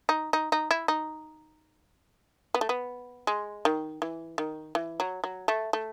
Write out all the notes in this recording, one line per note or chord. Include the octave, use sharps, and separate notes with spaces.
D#4
D#4
D#4
E4
D#4
B3
A3
B3
G#3
D#3
E3
D#3
E3
F#3
F#3
A3
A3